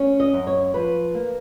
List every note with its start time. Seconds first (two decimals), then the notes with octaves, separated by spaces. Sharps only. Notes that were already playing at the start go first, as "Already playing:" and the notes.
Already playing: C#4
0.20 D#5
0.33 F#2
0.47 C#5
0.74 F3 B4
1.15 A#3